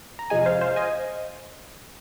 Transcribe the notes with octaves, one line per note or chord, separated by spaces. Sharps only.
A#5
F2 C3 F3 G#3 D#5 G#5
C5 F5
C5 F5
D#5 G#5